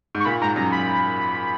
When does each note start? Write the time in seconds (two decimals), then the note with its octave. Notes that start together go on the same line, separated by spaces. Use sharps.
0.15 G#2
0.20 C#6
0.25 A#2 B5
0.41 G#2 A#5
0.56 F#2 A#5
0.72 B5